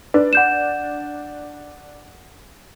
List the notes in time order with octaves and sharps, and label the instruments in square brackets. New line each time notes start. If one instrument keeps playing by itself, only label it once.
[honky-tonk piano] D4 [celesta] B4
[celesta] F#5 G6 E7